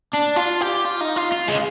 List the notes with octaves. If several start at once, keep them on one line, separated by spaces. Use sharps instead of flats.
D4
F4
G4
F4
D#4
F4
F4
G#3